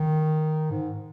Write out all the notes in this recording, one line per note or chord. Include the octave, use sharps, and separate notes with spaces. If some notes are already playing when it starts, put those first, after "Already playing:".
Already playing: D#3
G#2